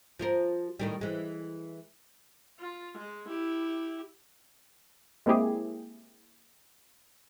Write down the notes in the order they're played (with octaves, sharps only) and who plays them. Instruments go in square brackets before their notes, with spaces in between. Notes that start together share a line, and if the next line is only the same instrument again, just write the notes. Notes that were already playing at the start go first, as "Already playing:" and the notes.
[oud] F3 F4 A#4
A2 D#3 G3
E3 G#3
[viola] F4
G#3
E4 G4
[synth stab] G#3 A#3 C4 E4 G4 G#4